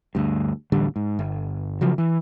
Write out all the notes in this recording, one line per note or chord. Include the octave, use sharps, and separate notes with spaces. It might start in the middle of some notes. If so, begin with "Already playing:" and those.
D2 G2
D1 A1 D3 G3
G#2
G1
C#3 F3 F#3
E3